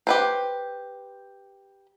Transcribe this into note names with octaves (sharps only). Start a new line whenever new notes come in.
G4 B4 C5